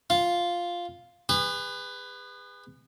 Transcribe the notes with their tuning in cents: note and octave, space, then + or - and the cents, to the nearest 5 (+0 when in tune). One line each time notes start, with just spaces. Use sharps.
F4 +0 F5 +0
G#4 -35 B4 +15